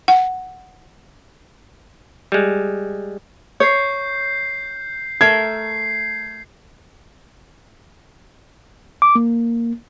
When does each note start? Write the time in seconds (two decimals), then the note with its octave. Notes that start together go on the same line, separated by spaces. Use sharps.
0.08 F#5
2.32 G3 G#3
3.60 C#5 G6 C7
5.21 A3 A#4 E5 G#6 C7
9.02 D6
9.15 A#3